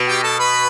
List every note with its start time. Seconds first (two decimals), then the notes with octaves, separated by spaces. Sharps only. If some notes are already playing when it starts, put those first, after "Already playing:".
Already playing: B2
0.08 G4 G5
0.23 A4 A5
0.39 B4 B5